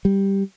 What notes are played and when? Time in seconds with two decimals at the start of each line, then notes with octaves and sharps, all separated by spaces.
0.05 G3